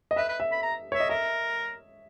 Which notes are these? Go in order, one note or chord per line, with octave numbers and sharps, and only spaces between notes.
D#5
B4 E5
B4
E5
B5
A#5
C#5 E5
D#5
A#4 E5